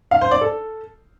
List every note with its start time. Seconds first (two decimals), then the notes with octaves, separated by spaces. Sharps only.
0.11 F5
0.21 C5
0.31 D5
0.41 A4